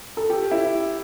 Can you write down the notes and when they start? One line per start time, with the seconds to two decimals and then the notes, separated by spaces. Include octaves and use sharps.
0.17 A4
0.30 G4
0.51 E4